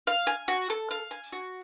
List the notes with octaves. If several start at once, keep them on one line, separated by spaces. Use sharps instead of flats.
F5
G#5
F#4
A4
F5
G#5
F#4